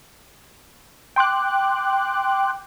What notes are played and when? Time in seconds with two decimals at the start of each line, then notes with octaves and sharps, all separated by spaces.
1.16 G5 C6 D6 F#6